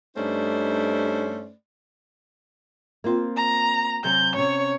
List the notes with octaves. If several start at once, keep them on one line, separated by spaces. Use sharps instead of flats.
G2 A3 C#4 D#4 C5 D5
A#3 C4 F4
A#5
C3 F#3 G#5 G6
C3 C#4 C#5